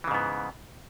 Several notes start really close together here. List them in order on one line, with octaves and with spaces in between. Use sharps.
E3 C#3 G#2 B3